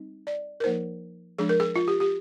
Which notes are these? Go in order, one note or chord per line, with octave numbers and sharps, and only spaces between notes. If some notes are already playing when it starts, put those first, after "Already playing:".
Already playing: G3 C4 D#4
D5
A#4
F3 A#3 D#4 C5
F3 G#3 D4 G#4
A#4
G#4
F4
G4
G4